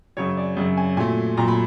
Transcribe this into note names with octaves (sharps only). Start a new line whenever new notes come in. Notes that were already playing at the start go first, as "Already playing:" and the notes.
F#2 C#3 F#3 C#5
D5
F#2 C#3 F#3
G#5
A#2 F#3 A3 G#5
A#2 F#3 A3 A#5
B5